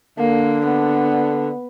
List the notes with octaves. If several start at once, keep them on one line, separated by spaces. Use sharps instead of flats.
D3 A#3
B3